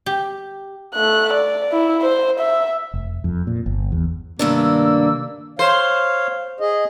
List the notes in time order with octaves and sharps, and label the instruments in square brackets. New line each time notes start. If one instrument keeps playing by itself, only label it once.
[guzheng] G4
[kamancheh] A3 F#6
D5
E4
C5
E5
[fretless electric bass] F1
F2
A#2
G1
E2
[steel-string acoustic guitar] G2 A3 D4 [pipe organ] C3 D#3 E6 [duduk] A#3
[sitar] C5 [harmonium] C#5 F5
[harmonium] G#4 D#5